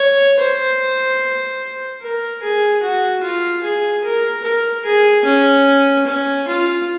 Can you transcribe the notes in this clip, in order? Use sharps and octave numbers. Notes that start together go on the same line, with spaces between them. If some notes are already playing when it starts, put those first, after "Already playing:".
Already playing: C#5
C5
A#4
G#4
F#4
F4
G#4
A#4
A#4
G#4
C#4
C#4
F4